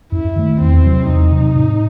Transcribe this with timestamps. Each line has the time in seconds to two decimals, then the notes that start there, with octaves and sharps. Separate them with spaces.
0.12 F#2 E4
0.36 D#3 A3
0.60 E2 C4
0.84 C3 F#3
1.08 E2 D#4
1.32 C3 F#3
1.56 A2